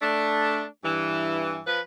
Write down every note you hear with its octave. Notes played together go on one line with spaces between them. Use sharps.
A3 D4
G2 E3
F3 B4